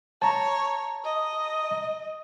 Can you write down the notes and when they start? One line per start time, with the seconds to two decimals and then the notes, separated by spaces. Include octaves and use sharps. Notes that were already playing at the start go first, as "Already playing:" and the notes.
0.22 C#5 A5 A#5
1.04 D#5